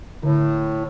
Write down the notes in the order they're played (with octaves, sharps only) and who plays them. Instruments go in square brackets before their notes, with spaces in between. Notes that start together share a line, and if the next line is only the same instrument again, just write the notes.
[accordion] A2 [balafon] D3